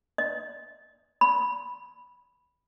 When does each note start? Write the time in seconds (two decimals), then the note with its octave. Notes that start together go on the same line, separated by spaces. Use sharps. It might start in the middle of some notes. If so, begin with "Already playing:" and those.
0.18 D#5
1.21 B5